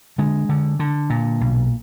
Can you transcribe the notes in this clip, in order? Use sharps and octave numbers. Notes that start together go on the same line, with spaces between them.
D3 G#3
D3
D3
A#2
B1